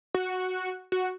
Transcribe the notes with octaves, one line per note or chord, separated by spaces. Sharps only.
F#4
F#4